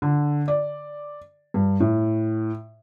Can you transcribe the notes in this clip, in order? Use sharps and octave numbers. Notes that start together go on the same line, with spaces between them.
D3
D5
G2
A2